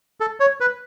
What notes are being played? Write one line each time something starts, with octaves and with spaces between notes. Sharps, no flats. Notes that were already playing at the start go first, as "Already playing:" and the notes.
A4
C#5
B4